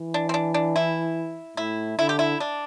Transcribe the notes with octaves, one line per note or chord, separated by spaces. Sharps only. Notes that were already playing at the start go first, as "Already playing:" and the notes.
Already playing: E3
D4
C4
D4
D4
E4
A2 E4
D3 E4
G4
E4
D4